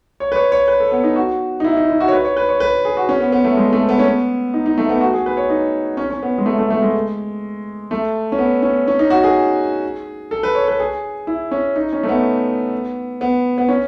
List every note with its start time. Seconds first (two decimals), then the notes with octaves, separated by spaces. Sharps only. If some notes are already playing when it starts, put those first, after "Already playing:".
0.20 C#5
0.32 B4
0.36 C#5
0.52 C#5
0.68 B4
0.80 A4
0.91 B3
1.03 D#4
1.16 F#4
1.60 D#4
1.64 E4
1.77 D#4
1.89 E4
2.01 F#4
2.08 C#5
2.12 B4
2.25 C#5
2.37 B4
2.49 C#5
2.60 B4
2.85 G#4
2.97 F#4
3.09 C#4
3.20 B3
3.32 B3
3.44 A3
3.57 G#3
3.73 A3
3.89 B3
3.99 C#4
4.05 B3
4.54 D#4
4.66 D#4
4.78 A3
4.89 B3
5.01 F#4
5.13 G#4
5.26 B4
5.37 C#5
5.50 D#4
5.97 C#4
6.10 C#4
6.22 B3
6.38 G#3
6.46 A3
6.59 A3
6.70 A3
6.82 G#3
7.91 A3
8.32 C#4
8.38 B3
8.62 C#4
8.87 C#4
8.99 D#4
9.10 F#4
9.24 G#4
10.31 A4
10.43 B4
10.55 C#5
10.68 B4
10.80 G#4
11.27 E4
11.51 C#4
11.76 D#4
11.93 C#4
12.03 A3
12.08 B3
13.21 B3
13.58 B3
13.68 C#4